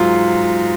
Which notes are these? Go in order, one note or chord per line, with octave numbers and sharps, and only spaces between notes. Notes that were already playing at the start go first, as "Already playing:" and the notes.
Already playing: G#2 F#3 F4